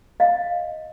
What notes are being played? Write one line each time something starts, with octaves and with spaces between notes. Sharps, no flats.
D#5 F5